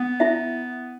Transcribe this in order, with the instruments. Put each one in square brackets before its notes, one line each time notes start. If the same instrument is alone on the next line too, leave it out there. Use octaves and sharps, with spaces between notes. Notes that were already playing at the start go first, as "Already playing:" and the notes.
Already playing: [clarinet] B3
[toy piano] E4 E5